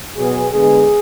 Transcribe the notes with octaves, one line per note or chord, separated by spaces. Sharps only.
B2 F#3 B3 G#4
D3 G#3 B3 G#4